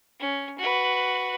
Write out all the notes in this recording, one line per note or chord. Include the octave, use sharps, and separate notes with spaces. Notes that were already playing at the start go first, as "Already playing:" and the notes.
C#4
F#4 B4